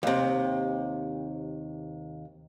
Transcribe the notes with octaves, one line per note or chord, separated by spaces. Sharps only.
D#2 C3